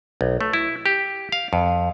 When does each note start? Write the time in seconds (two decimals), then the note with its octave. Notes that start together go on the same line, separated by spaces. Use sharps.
0.21 B1
0.41 A3
0.54 E4
0.86 G4
1.32 F5
1.53 F2